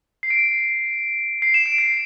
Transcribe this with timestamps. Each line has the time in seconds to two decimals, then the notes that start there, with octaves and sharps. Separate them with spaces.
0.23 C7
0.30 D7
1.42 C7
1.54 E7
1.66 D7
1.78 C7